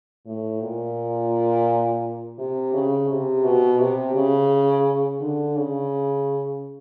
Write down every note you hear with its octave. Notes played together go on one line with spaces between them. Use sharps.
A2
A#2
C3
C#3
C3
B2
C3
C#3
D3
C#3